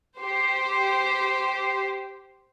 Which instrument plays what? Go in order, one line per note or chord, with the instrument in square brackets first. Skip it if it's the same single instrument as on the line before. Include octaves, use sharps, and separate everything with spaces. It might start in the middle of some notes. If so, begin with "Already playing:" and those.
[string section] G4 C5